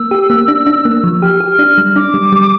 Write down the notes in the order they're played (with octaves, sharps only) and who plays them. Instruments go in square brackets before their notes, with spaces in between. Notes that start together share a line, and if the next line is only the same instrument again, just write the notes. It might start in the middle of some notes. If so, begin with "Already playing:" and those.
Already playing: [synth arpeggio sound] A#3 [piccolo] E6
[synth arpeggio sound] G4
A#3
D4
D4
A#3
F3
[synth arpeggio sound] G4 [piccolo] F6
[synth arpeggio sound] G4
D4
G3
[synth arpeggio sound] D4 [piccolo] D6
[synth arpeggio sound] G3
G3